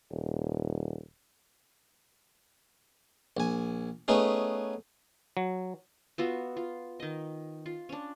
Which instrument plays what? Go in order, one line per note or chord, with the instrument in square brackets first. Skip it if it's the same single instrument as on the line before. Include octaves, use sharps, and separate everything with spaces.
[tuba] D#1
[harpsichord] A#1 G#5
A3 B3 C#4 D#4 G#4
[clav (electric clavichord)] F#3
[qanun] B3 F4 F#4 E5
F4
D#3 D#5
F4
C#4 D4